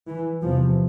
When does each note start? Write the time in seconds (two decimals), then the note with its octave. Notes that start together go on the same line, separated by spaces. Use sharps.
0.09 E3
0.42 E2 C3 F3